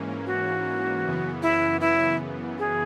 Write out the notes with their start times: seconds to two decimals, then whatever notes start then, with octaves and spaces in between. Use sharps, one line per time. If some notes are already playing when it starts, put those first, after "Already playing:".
Already playing: G#2 E3 A#3 C#4
0.26 F#4
1.04 F#2 C#3 E3 B3
1.42 E4
1.81 E4
2.59 G#4